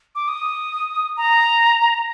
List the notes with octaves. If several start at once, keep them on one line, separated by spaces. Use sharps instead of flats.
D6
D#6
A#5